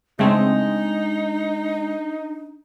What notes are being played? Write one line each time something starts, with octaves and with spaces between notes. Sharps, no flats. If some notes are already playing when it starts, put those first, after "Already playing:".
C#3 G#3 A3 C4 D4 D#4 F5